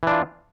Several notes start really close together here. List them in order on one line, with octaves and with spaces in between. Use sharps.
E3 D4 F4